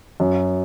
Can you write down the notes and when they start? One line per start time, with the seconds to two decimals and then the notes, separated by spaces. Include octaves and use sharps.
0.20 F#2